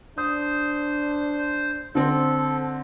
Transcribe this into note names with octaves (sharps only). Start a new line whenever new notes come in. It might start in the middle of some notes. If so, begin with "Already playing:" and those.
D4 C5 D#6
D3 C4 A4 C5